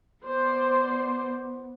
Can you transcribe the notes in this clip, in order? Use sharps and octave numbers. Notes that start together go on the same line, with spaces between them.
B3 C5 D5